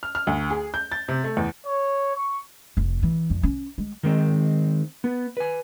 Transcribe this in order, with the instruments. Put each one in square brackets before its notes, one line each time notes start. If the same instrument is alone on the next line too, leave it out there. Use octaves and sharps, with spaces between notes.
[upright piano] F6
F6
D2
G#4
G6
A6
C3
A3
E2
[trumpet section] C#5
C#6
[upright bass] F1
E3
F2
C#4
G#3
[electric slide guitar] D#3 G#3 C4
B3
B4 G#5